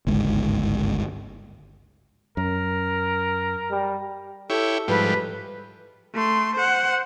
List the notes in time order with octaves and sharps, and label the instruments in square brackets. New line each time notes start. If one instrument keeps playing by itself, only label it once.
[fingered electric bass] G1 C#2 G#2
[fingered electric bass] F#2 [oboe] A#4
[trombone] G3
[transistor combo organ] E4 G4 C#5 [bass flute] A4
[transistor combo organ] G#2 F3 G3 [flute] B4
[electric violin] A3 C6
C5 F#5